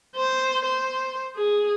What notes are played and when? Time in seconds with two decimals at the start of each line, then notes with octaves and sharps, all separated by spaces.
0.16 C5
0.65 C5
1.36 G#4